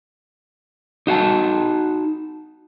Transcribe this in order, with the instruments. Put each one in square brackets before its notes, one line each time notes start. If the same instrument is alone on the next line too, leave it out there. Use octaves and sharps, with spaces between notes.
[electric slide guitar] D#4 F#4 F5 A5